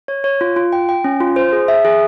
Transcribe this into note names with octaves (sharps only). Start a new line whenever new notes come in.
C#5
C#5
F4
F4
G5
G5
C#4
F4
C5
G#4
E5
G#4